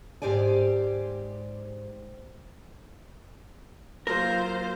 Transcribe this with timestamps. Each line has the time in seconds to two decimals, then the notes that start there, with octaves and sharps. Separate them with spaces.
0.22 G#2 G4 C5 D5 G#5
4.07 F#3 A#3 F4 A#4 C5